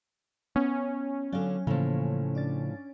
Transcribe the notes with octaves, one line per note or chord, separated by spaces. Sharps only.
B3 C#4
D3 F#3 D5 F5
A2 C#3 E3 F3 A#3
D4 D5 A6